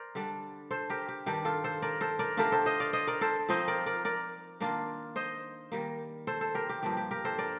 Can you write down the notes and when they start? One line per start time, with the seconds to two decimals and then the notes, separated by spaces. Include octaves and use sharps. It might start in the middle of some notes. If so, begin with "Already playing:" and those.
Already playing: A#4 C5 D5
0.15 D3 G3 D4
0.71 A4 C5
0.90 G4 A#4
1.08 G4
1.26 G2 D#3 G3 D4 G4
1.45 F4 A4
1.64 A4 C5
1.82 A#4 D5
2.01 A4 C5
2.19 A#4 D5
2.37 D3 A3 D4 F4 G4 A#4
2.52 A4 C5
2.66 C5 D#5
2.80 D5 F5
2.93 C5 D#5
3.07 A#4 D5
3.21 A4 C5
3.49 F3 C4 D#4 C5 D#5
3.68 A#4 D5
3.86 A#4 D5
4.05 A#4 D5
4.60 D#3 A#3 D4 F4
5.16 C5 D#5
5.72 D#3 G3 A#3
6.27 A4 C5
6.41 A4 C5
6.55 G4 A#4
6.69 G4
6.83 G2 F3 A#3 D4 G4
6.97 G4
7.11 G4 A#4
7.25 A4 C5
7.38 A#4 D5